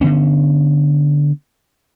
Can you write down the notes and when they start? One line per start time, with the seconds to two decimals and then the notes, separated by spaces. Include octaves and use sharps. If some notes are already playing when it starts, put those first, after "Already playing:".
0.01 D3 E3 B3 C#4